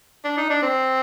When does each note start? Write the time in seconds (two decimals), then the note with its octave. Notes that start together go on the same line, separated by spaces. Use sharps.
0.24 D4
0.37 D#4
0.50 D4
0.63 C4